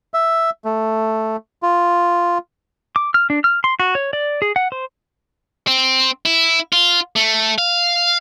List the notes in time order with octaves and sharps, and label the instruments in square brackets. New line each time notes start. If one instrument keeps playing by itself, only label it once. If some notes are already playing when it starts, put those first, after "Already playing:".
[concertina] E5
A3
F4
[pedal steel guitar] D6
F6
D4
F6
C6
F#4
C#5
D5
G#4
F#5
C5
[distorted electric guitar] C4
E4
F4
A3
F5